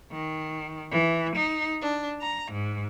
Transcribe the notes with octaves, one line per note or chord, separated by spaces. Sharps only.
D#3
E3
D#4
D4
A#5
G#2